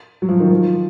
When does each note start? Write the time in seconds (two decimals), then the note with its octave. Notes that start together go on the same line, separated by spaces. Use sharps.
0.22 F#3
0.29 F3
0.40 D#3
0.51 F3